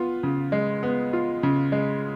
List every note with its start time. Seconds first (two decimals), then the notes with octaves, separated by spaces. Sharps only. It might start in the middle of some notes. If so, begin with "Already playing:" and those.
Already playing: B3 F4
0.23 C#3
0.52 G#3
0.83 B3
1.13 F4
1.43 C#3
1.72 G#3